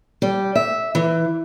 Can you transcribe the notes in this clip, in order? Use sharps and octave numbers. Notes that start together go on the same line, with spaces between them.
G3
E5
E3